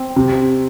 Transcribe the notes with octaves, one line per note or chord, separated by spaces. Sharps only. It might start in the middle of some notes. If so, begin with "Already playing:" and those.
Already playing: C4
C3